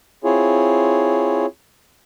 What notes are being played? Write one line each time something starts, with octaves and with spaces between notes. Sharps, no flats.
C4 E4 F4 G#4 C#5